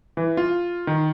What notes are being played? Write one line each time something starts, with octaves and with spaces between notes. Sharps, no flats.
E3
F4
D#3